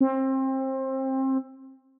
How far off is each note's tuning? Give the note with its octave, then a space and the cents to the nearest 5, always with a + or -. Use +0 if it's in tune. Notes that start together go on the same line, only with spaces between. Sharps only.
C4 +25